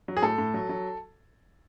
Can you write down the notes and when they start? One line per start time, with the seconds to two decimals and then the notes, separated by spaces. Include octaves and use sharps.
0.08 F#3
0.17 G#4
0.22 A2 A4
0.38 A2
0.54 F#3
0.69 F#3